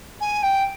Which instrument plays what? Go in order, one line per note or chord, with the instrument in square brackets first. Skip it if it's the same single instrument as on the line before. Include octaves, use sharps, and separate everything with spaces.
[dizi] G#5
G5